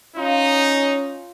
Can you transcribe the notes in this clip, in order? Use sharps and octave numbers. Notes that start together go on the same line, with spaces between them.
C#4 D#4 F4